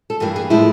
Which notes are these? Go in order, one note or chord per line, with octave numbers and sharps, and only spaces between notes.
A4
G2 E3 G3 A#3
G#4
A2 F3 G#3 E4